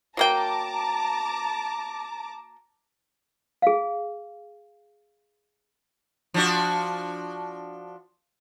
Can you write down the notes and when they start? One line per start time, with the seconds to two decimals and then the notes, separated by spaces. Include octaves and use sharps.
0.17 F#3 A#3 G5 A5 A#5 D6
3.62 G#4 F5
6.34 F3 D4 F#4